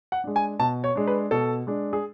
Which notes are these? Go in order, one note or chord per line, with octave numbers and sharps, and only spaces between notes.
F#5
G#3 D4
G#5
B2 A5
C#5
G#3 D4
B4
B2 A4
G#3 D4
G#4